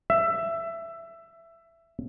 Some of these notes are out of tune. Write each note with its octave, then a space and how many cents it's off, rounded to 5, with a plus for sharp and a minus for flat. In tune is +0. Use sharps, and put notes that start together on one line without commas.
E5 +15